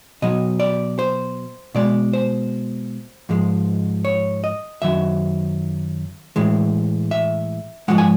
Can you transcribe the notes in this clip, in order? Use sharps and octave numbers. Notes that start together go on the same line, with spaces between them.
B2 F#3 D#5
D5
C5
B2 G#3 D5
C5
G#2 F3 G#3
C#5
D#5
F#2 D#3 F#3 E5
A2 E3 G#3
E5
G#2 F3 G#3 F#5
G#5